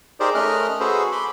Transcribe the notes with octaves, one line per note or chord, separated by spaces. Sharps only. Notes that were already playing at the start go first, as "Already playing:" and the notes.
D#4 G4 G#4 A#4 C5 D5
A3 C#4 A#4 D#5 F6 F#6
C#4 F#4 G#4 A4 B4 C5
B5 C6 D6